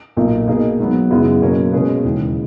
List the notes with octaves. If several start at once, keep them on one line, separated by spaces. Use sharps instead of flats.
B1 A#2 A#3 D#4
B2 A#3 D#4 G#4
G#2 F#3 B3
F#2 C#3 G#3 B3 E4
B2 F#3 A#3 C#4 F#4
B2 G#3 C#4 G#4 B4
E1 D#2 C#3 E3